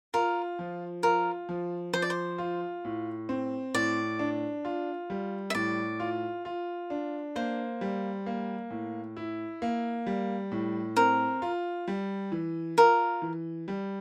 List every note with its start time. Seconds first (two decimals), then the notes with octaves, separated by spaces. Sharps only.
0.14 F4 A#4
0.59 F3
1.03 F4 A#4
1.49 F3
1.93 F3 C5
2.02 D5
2.10 C5
2.38 F4
2.85 A2
3.29 C4
3.74 A2 D5
4.19 D4
4.65 F4
5.10 G3
5.50 E5
5.54 A2 D5
6.00 F4
6.45 F4
6.90 D4
7.36 A#3 C5
7.81 G3
8.26 A#3
8.70 A2
9.16 E4
9.62 A#3
10.06 G3
10.52 A2
10.97 C4 A#4
11.42 F4
11.88 G3
12.32 E3
12.78 F4 A#4
13.22 E3
13.68 G3